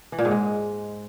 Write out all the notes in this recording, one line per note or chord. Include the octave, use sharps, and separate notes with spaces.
E3
A#2
G#2
G#3